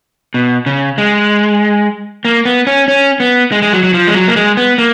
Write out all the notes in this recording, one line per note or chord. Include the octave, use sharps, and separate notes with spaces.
B2
C#3
G#3
A#3
B3
C#4
C#4
B3
G#3
G#3
F#3
F#3
F3
G#3
F#3
A#3
G#3
B3
A#3